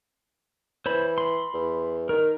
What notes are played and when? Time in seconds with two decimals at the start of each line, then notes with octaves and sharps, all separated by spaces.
0.86 E3 C5 C#5 B5
1.18 B5 C6
1.54 E2
2.09 D#3 A#4